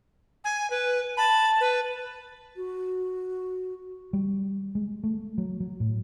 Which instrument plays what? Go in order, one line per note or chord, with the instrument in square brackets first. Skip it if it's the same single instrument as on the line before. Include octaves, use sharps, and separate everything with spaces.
[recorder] G#5
B4
[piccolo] A5 [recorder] B5
[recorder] B4
[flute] F#4
[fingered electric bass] G3
G#3
A3
F#3
F#3
A2